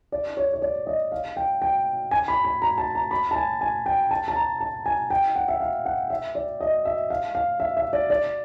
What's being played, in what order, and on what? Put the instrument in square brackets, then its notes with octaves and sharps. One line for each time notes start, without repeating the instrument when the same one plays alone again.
[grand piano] D5
C#5
C#5
D5
D#5
F5
G5
G5
G#5
B5
B5
A#5
A5
A#5
B5
A5
G#5
G#5
G5
A5
A5
A#5
A5
G#5
G5
F#5
E5
F5
F#5
E5
D5
D#5
E5
F5
F5
E5
E5
D5
D5